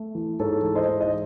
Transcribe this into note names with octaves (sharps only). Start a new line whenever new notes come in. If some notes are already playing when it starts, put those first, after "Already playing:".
Already playing: A3
E3
G#2 A4 C#5
E3
C5 D#5
G#2
D#5